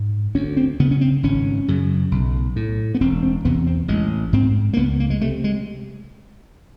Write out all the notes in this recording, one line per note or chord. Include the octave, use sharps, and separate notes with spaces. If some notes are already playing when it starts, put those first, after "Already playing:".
Already playing: G#2
D2 C#4
C4
C#3 B3
C#4
C4
G#1 C#4
F#2 C#3
B1
A2
B3
E1 C4
C4
E2 C3 B3
C4
A1 G#3
G#2 C4
A#3
C#2 B3
A#3
G#3
C3 A3
G#3